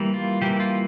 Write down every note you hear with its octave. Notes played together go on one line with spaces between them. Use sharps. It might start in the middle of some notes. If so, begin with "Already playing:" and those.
Already playing: E3 G3 A#3
F4
E3 G3 A#3 G4
F4